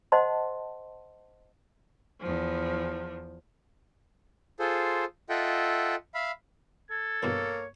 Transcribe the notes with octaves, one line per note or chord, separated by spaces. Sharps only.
C5 D#5 F#5 A5 C6
E2 F3
F4 G#4 A4 C5
F4 A4 D#5 E5 F#5 G5
E5 F5 B5
A4 G#6
G2 B2 E3 A#3 C#5